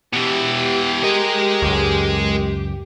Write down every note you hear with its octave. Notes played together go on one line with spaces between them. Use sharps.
B2 E3 G4
G#3 A#4 D#5
C#2 F#2